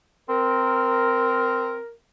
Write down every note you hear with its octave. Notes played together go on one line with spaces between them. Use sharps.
C4 A#4